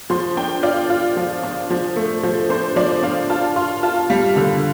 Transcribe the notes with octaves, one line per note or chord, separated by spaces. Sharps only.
F3 C6
D4 G5
F4 D5
F4
F3
D4
F3
A3
F3
D4 C5
F3 D5
D4 F5
F4 A5
F4 C6
F4 A5
G3 F5
D3 F5